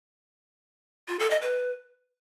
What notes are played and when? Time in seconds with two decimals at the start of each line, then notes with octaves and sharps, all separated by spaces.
1.08 F4
1.19 A4
1.30 D#5
1.42 B4